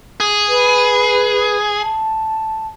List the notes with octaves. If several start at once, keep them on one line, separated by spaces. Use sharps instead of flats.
G#4
B4
A5